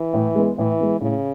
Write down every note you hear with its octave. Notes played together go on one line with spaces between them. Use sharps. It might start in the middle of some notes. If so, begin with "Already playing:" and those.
Already playing: E3
A2
G#3 B3
A2 E3
G#3 B3
A2 C#3